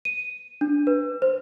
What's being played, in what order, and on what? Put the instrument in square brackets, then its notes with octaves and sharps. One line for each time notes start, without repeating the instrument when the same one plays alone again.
[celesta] D#7
D4
B4
C5